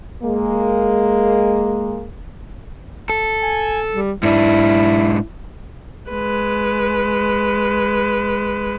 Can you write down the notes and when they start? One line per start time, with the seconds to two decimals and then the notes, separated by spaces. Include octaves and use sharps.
0.23 G#3 A#3
3.09 A4
3.42 G#5
3.93 G3
4.23 G#2 D4 E4
6.11 G#3 B4